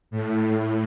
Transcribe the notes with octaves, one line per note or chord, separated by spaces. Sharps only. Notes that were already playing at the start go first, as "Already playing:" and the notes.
A2